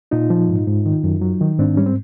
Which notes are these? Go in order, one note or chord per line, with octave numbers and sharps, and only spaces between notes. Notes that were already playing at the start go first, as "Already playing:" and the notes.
A#2 D#4 F4
F3
G#2
G#2
D#3
F#2
F#3
D#3
G#2 C4 D4
G3 C#4
C4